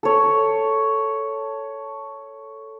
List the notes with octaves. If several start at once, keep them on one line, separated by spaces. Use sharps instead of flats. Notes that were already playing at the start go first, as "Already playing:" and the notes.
A4 C#5